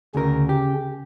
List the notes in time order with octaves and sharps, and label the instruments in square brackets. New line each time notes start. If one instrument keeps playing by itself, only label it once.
[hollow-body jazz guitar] D2 A#4 [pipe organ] C#3 C#4
[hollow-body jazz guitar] G4